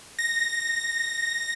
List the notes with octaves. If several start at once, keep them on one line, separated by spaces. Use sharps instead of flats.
A#6